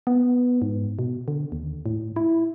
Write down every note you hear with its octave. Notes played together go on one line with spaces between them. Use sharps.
B3
G#2
B2
D3
D#2
A2
E4